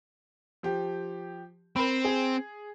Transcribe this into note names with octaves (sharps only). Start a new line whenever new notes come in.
F3 G4
C4 A#4 B5
G#4